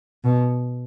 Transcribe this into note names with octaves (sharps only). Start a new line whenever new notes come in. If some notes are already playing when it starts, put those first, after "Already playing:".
B2